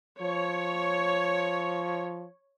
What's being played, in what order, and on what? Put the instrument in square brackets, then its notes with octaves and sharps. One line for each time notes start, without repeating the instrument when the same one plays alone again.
[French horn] F3 [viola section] C#5